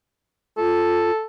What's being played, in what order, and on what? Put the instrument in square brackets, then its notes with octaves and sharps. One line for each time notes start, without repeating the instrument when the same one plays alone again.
[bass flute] F4 [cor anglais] A4